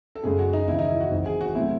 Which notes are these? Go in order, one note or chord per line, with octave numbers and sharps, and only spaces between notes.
A4
F#1 F#2 C#3 G#3 G#4
F#4
D#4
D#2 C#3 E3 E4
D#4
E4
F#4
G#1 G#2 E3
G#4
F#4
C3 F#3 A3 C4 E4